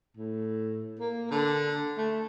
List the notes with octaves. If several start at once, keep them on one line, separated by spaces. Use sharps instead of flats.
A2
A#3
D3
A3